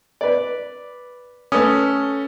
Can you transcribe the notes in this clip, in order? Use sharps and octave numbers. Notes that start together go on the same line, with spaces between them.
B4 D5
A3 C#4 A4 B4 D#6